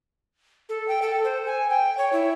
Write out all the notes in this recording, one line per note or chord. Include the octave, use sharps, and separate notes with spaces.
A4
G5
A4
C5
G#5
G5
C#5
E4